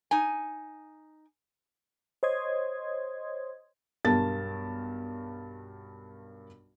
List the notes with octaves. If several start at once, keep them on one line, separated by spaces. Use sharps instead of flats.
D#4 G#5
C5 C#5 D#5 C6 D#6 G#6
B1 G2 A#4 A5 A6